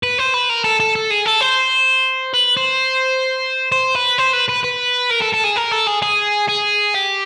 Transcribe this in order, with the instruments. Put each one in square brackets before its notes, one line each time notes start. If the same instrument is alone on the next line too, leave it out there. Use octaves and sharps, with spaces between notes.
[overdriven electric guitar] B4
C5
B4
A#4
A4
A4
A4
G#4
A4
C5
B4
C5
C5
B4
C5
B4
B4
B4
A#4
A4
A4
G#4
A#4
A4
G#4
G#4
G#4
G4